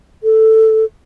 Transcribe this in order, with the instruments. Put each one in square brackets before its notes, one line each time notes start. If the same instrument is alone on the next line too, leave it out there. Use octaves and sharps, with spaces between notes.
[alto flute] A4